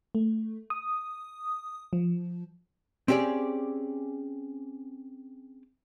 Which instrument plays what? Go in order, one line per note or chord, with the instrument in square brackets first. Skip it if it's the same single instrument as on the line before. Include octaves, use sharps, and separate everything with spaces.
[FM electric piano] A3
D#6
F3
[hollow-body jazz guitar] C4 C#4 G4 G#4 D5